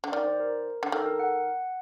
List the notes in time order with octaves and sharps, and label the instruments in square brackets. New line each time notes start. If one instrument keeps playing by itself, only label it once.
[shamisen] D3
[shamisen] D#3 [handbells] D5
[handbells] C5
A#4
[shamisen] D3
[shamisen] D#3 [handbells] A4
[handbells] A#4
F#5